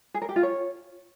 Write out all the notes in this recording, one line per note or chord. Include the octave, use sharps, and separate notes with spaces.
G#4
A#4
G4
F4
C#5